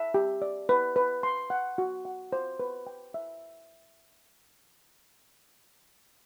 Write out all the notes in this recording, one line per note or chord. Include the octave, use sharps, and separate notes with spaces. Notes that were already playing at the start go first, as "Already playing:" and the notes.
Already playing: E5
G4
D5
B4
B4
C6
F#5
F#4
F#5
C5
B4
G5
E5